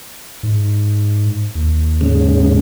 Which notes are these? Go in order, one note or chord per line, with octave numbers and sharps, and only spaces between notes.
G#2
D#2
G#2 C#3